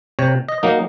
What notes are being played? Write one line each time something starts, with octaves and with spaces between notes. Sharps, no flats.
C3 C#5
D#5
F#3 A#3 D#4